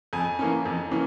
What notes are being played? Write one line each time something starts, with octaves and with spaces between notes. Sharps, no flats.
F2 G#5
E3 A#3 C#4
F2
E3 A#3 C#4